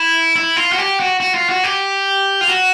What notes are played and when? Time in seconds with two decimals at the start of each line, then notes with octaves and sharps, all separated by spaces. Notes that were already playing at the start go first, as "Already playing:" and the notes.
Already playing: E4
0.36 E4
0.56 F4
0.72 F#4
0.78 G4
1.00 F#4
1.20 F#4
1.34 F4
1.49 F#4
1.64 G4
2.41 F4
2.48 F#4